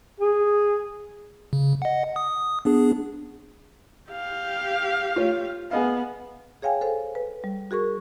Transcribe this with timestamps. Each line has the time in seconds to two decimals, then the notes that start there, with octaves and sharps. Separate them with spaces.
0.20 G#4
1.53 C#3
1.82 D#5 F#5
2.16 D#6
2.65 B3 D4 G#4
4.10 G4 F5
5.16 F4 C#5
5.71 B3 G#4 D#5 F5
6.62 G#4 C#5 F5 G5 G#5
6.81 A4 C5 F5
7.15 B4
7.44 G3
7.71 F#4 G#4 A#4 C#6